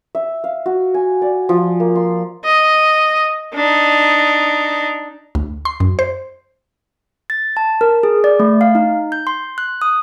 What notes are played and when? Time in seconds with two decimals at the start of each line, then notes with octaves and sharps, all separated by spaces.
0.15 E5
0.44 F5
0.66 F#4
0.94 G#5
1.22 D5
1.49 F3
1.80 A#3
1.95 C6
2.45 D#5
3.55 D4 D#4
5.35 D2
5.65 C6
5.80 F#2
5.99 C5
7.30 A6
7.57 A5
7.81 A#4
8.03 G#4
8.24 D5
8.40 A3
8.61 F5
8.75 D#4
9.12 G6
9.27 C6
9.58 F#6
9.82 D#6